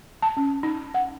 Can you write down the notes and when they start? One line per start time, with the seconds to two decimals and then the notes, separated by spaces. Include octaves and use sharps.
0.22 A5
0.37 C#4
0.63 D#4
0.94 F#5